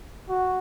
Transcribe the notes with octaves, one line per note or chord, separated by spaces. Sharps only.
F#4